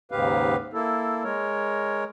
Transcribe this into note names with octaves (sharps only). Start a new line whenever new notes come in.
D#2 G#2 C#3 G4 B4 F5
A#3 E4 A4
G#3 A#4 C#5